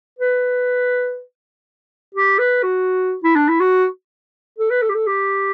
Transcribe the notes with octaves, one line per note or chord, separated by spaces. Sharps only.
B4
G4
B4
F#4
E4
D4
E4
F#4
A4
B4
A4
G4
A4
G4